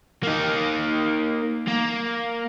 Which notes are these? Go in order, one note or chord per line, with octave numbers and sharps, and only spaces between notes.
A#3 D#4
A#3